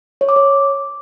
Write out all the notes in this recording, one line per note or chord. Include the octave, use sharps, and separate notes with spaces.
C#5
D6
C#5